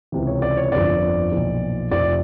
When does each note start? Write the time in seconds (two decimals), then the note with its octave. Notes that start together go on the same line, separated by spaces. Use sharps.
0.12 C#2 C3 E3
0.27 C#5
0.42 D5
0.57 C#5
0.72 G1 F2 D3 F3 D5
1.32 B1 A#2 F3
1.91 F1 F2 C3 F3 D5